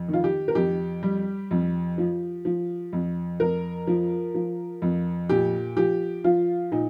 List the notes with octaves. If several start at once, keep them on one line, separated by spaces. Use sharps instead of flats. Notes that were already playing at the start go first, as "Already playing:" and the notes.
Already playing: F2
D#3
F4
G4
A#4
F2 G4
G3
F2
F3
F3
F2
F2 A#4
F3
F3
F2
A#2 G4
F3 G4
F3 F4
A#2 D#4